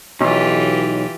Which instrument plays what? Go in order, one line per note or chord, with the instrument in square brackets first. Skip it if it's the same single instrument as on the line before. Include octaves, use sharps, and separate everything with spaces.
[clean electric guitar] B1 [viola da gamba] E3 F4 G4